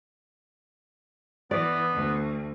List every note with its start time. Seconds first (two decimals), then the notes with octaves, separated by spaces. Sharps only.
1.51 E3 B3 D5
1.92 D2